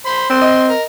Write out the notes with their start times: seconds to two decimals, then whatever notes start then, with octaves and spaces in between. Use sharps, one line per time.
0.06 C5 B5 C6
0.30 C4 C6
0.41 D#5
0.70 A#4